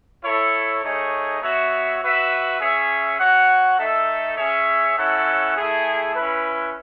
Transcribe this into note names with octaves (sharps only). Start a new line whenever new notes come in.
E4 A4 C#5
A3 D#4 G#4 C#5
B3 F#4 C#5 E5
F#4 B4 E5
C#4 G#4 C#5 E5
F#4 C#5 F#5
A3 D#4 A4 E5
C#4 G#4 C#5 E5
C#4 E4 A4 C#5 F#5
A3 E4 G#4
C#4 E4 B4